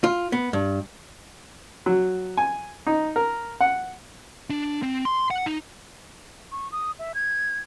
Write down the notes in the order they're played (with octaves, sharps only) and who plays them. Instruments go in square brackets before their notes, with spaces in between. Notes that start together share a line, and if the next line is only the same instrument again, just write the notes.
[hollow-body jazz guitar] F4
B3
G2
[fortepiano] F#3
G#5
D#4
A#4
F#5
[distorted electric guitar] D4
C4
C6
F#5
D#4
[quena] C#6
D#6
E5
G#6